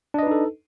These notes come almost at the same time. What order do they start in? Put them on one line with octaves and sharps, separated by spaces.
D4 D#5 B4 D#4 A4